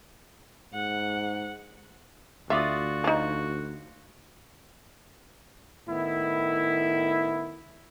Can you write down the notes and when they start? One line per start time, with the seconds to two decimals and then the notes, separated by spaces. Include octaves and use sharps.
0.74 G#2 F#5
2.50 D2 F4 F#4 D5 E5 D#6
3.04 F3 D#4
5.88 A2 D#3 B3 E4